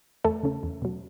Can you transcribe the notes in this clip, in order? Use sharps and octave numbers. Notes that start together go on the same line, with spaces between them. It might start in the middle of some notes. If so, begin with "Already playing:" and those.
E2 A3 A4
C#3 A3 C#4
E2
B2 F#3